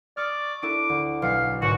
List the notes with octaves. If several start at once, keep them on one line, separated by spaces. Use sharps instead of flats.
D5 C#6 D#6 F6
D4 E4 A4 D6
D2
B1 F5 F#5
G1 G#2 F#4